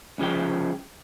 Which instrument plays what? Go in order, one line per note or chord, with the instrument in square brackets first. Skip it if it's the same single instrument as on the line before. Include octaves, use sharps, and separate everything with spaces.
[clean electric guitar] C2 C#3 F3 G#4 G5